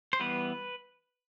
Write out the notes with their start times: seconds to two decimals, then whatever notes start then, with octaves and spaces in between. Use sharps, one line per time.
0.13 C5
0.19 E3 G3 B3 B4